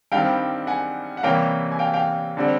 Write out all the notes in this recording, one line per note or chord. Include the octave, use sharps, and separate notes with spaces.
G2 D#3 G3 C4 F5 G5
F#5 G#5
F#5
C3 E3 G3 A#3 C#4 F5 G5
G#5
F5 G5
F5 G5
D3 G3 C4